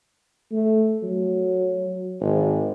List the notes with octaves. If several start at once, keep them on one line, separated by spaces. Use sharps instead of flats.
A3
F#3
G#1